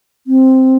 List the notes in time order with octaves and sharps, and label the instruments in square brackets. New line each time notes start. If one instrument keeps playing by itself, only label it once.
[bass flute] C4